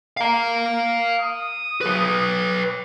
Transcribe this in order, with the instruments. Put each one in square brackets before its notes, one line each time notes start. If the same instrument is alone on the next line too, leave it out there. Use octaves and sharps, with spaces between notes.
[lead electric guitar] F5 A#5
[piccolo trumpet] D#6
[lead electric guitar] F#3 B4